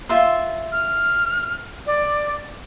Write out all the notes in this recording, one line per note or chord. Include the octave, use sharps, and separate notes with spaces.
F4 E5 C6
F6
D5